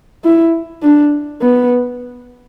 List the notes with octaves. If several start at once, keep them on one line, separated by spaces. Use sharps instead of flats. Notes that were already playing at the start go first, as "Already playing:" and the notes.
E4
D4
B3